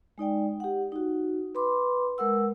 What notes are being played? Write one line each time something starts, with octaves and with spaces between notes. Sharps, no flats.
G#3 D#4 D5 G5
G4 F#5
D#4 F#4
B4 B5 C6 D6
G#3 A#4 F#5 E6